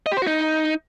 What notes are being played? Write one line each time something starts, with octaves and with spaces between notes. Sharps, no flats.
D#5
G4
C5
F#4
D#4